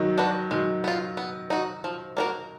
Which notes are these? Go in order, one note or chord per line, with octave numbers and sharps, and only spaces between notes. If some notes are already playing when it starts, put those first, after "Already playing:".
Already playing: D#3 F#3
D4 F#4 B4
D#3 F#3 G#3
B3 F4
B3
D#4 F#4
F3
A#3 D4 F#4 A#4